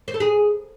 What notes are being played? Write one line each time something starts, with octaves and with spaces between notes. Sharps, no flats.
C5
A4
G#4